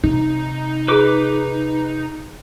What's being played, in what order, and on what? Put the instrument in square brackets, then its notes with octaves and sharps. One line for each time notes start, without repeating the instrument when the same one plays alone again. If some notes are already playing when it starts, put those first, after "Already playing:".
[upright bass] C3 [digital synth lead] D#4
[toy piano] F4 G#4 [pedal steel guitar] B4 D6